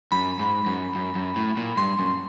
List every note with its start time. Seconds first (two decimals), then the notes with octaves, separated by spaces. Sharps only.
0.12 F#2 B5
0.39 G#2
0.66 F#2
0.95 F#2
1.15 F#2
1.36 A2
1.57 A#2
1.77 G2 C6
1.99 F#2